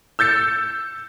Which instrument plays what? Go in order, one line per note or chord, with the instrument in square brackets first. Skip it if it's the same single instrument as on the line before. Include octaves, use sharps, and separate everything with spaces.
[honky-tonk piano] E6 G6 A6 C#7